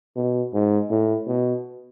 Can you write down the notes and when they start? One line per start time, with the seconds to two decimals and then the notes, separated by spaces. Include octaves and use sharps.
0.16 B2
0.54 G#2
0.91 A2
1.28 B2